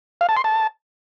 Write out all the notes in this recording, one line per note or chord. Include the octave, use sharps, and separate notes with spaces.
F5
A5
C6
A5